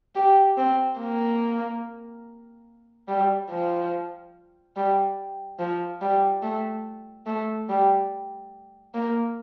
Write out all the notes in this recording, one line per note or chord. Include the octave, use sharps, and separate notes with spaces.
G4
C4
A#3
G3
F3
G3
F3
G3
A3
A3
G3
A#3